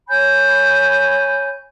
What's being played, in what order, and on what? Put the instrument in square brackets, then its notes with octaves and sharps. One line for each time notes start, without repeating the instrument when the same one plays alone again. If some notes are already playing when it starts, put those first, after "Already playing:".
[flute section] C#5 G#5 B5 G6